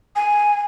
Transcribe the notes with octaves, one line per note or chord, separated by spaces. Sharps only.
G#5